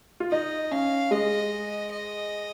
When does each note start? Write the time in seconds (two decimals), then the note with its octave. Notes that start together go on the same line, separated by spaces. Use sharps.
0.20 F4
0.31 D#4 D#5
0.71 C#4 F5
1.11 G#3 D#5
1.91 D#5